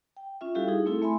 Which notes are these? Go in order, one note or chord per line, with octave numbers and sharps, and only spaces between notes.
G5
C#4 F4 E5
G3 E4 F#4 G4 A4 F5
D#4 G#4
A3 C4 E4 A4
A3 E5 G#5 B5 C6